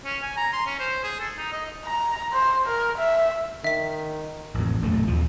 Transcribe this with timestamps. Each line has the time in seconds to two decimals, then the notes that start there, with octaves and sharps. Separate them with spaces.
0.05 C#4
0.22 G#5
0.37 A#5
0.53 C6
0.66 C#4
0.79 C5
1.03 G#4
1.20 A4
1.37 D#4
1.53 D#5
1.85 A#5
2.33 C5
2.66 A#4
2.98 E5
3.64 D#3 E5 B6
4.55 A1 F2
4.82 E1 A#1 F#2 A3
5.08 D#2 F3